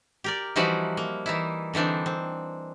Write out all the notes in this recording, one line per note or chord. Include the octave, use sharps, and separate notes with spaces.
G4 A#4 D5
E3 F3 G3 D#4 E4 F#4
A#3
E3 D#4 E4
D3 E3 C4 D4 D#4
C4